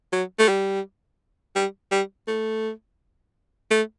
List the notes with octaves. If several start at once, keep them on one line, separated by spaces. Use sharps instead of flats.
F#3
A3
G3
G3
G3
A3
A3